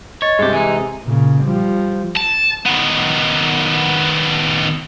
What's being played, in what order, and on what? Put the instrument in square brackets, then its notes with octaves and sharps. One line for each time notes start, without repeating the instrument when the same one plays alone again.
[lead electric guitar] C#5 [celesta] D#5 A6
[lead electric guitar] G2 G4 [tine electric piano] C3 G#3
[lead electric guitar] E3 D#4 [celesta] G#5
[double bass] A#2 C#3
F3 G3
[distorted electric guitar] A5
D#3 B3